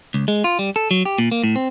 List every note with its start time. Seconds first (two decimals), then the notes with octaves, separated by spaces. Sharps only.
0.14 C#2
0.28 G#3
0.44 F4
0.59 G3
0.76 A4
0.91 F#3
1.05 G4
1.18 A#2
1.31 A#3
1.43 A2
1.56 C4